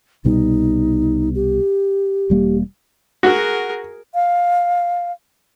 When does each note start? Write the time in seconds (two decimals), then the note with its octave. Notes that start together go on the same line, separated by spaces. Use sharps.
0.25 C2 B2 G3 D#4
1.35 G4
2.30 E1 G3 A#3
3.23 F#4 G#4 A#4
4.14 F5